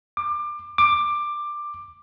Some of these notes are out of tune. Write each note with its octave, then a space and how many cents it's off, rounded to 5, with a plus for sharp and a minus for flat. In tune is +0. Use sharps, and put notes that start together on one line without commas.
D6 +25
D6 +15